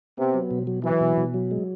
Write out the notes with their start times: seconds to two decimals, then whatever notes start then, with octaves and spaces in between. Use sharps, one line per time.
0.18 C3 B3
0.34 F#3
0.51 B2
0.67 F#3
0.84 E3 F#3
1.01 B2
1.17 B2
1.34 F#3
1.51 G#3